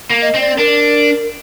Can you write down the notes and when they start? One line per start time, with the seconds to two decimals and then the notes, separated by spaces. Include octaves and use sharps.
0.10 A#3
0.22 D#5
0.35 C4
0.40 D5
0.58 D4 A#4